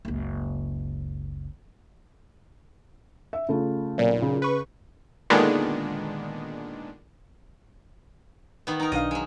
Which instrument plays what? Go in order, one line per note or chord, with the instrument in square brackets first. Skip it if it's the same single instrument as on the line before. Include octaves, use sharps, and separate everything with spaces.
[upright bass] F#1 C#2
[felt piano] E5
C#3 A3 F4
[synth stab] B1 A#2
[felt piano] C#3
[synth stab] B4 C#6
A#2 D3 D#3 G#3 B3 D4
[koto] D#3 B3
D#4 A#4
[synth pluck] B1 D4 F5 [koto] D#5
[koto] F#3 G#3